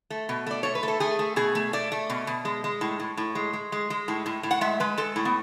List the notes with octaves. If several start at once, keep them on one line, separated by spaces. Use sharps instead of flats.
A3
B2
A3 D5
A3 C#5
B4
A3
A4
A3 G#4
A3
B2 G#4
A3
A3 D5
A3
B2
B2
G#3
G#3
A2
A2
A2
G#3
G#3
G#3
G#3
A2
A2
A2
F#5
G#3 E5
G#3 B4
G#3 A4
A2
B3